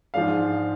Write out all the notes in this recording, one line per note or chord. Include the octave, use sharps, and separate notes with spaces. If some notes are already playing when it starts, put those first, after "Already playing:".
G#2 F3 G#3 D4 F5